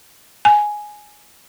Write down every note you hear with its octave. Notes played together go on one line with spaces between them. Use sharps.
G#5